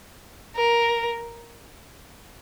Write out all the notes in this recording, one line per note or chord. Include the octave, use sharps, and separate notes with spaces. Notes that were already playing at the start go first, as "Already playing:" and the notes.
A#4